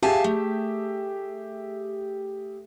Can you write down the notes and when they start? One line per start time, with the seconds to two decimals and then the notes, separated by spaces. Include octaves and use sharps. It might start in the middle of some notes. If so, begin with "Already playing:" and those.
0.03 G4 G#4 E5 F5 G#5 A5
0.24 A3